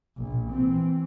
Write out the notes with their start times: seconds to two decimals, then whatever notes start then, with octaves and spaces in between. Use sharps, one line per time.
0.17 A#1
0.51 E3 C4